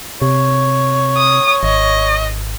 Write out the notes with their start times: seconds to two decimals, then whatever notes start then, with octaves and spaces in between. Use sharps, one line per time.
0.22 C3 C#5
1.18 D#6
1.63 G#1 D#5